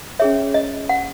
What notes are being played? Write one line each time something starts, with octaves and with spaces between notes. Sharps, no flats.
C#4 G#4 C#5 E5
D#5
F#5